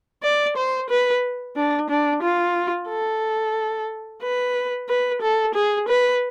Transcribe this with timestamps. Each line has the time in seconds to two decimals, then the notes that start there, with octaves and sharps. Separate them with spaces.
0.23 D5
0.56 C5
0.90 B4
1.56 D4
1.89 D4
2.22 F4
2.88 A4
4.22 B4
4.89 B4
5.22 A4
5.55 G#4
5.88 B4